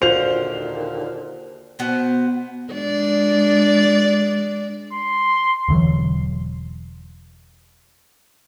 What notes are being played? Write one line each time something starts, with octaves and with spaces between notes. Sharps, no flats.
D#2 A#2 D3 F4 F#4 C5 F7
B2 B3 C5
G#3 D4 D5
C6
E1 D3 E3 F#3